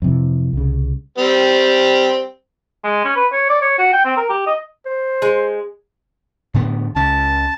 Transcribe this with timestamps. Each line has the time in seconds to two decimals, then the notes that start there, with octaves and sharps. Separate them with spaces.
0.02 F2 C3 E3
0.53 C2 C#3
1.18 G3 C4
2.84 G#3
3.05 C#4
3.16 B4
3.33 C#5
3.49 D5
3.62 C#5
3.79 F#4
3.93 G5
4.05 C4
4.17 A#4
4.29 G4
4.47 D#5
4.86 C5
5.22 G#3
6.54 A2 D3 B3
6.96 C#2 C#3 C#4 A5